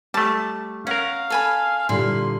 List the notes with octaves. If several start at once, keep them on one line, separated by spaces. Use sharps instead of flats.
G3 A3 A5
C#4 A#4 F5 F#5
A4 G#5 B5
A#2 D3 G3 E4 C6